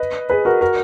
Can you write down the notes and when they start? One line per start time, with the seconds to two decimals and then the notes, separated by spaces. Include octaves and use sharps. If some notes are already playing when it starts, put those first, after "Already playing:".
Already playing: B4 D#5
0.30 G#4 B4
0.45 F#4 A#4
0.61 F#4 A#4